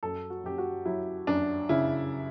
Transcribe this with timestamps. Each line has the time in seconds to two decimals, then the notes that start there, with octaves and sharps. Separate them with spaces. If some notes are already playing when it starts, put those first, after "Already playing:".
0.03 F#2 A4
0.30 F#4
0.44 F#2 G4
0.58 F#4
0.85 F#3 E4
1.27 F#2 D4
1.69 C#3 E4